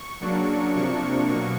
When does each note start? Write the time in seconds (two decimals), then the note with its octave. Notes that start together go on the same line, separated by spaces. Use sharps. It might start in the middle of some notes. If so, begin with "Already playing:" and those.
Already playing: C#6
0.21 C#3 F#3 A#3 D4
0.74 C3 F3 A#3 D4 C#6
1.28 B2 F#3 A#3 C#6